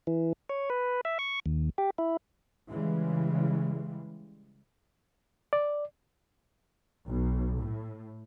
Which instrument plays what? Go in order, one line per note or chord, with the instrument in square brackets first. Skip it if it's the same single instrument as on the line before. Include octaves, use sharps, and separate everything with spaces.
[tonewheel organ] E3
C#5
B4
E5
C#6
D#2
G4
E4
[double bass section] C#3 E3 G3 G#3
[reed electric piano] D5
[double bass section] B1
A2